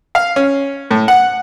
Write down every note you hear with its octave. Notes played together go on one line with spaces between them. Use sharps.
F5
C#4
A2
F#5